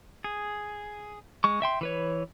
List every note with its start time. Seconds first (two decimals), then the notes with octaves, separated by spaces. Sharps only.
0.24 G#4
1.44 G#3 C#6
1.62 E5 G5 C6
1.81 E3 B4 C#5